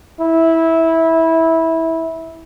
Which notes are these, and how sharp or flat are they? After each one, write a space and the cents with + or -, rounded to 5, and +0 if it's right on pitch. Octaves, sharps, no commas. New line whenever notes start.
E4 -15